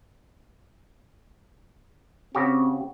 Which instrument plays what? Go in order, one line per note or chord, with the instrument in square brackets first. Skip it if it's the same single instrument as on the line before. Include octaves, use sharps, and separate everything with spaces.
[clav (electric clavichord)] C#3 F#4 G4 [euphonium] C4